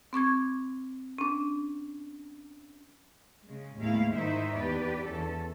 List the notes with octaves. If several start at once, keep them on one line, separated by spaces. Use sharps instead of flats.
C4 C#6 D6 G#6
C#4 D4
C#3 G#3
D#2 A2 G#3 B3 E4 F5
G#2 D#3 D#4 E4 C5 E5
E2 G4 B4 D5
E2 C#4 A4